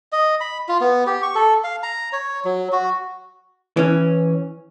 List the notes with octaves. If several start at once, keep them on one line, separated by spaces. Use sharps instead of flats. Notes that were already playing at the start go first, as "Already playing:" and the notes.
D#5
B5
F4
B3
G4
C#6
A4
F5
A#5
C#5
F#3
F#4
E3 C#4